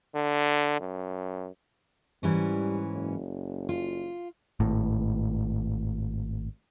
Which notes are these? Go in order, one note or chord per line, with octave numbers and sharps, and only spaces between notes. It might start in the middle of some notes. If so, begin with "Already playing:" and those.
D3
F#2
G#2 E3 G3 C#4
F#1
F4
G#1 A2